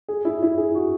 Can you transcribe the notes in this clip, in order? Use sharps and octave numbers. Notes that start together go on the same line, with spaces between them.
G#4
E4
E4
G#4
F#4